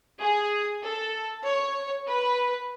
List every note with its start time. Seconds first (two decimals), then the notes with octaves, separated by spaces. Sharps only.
0.20 G#4
0.82 A4
1.45 C#5
2.08 B4